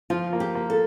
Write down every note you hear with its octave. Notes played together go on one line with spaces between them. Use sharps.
F3 F4
A#3
G4
A#3
A4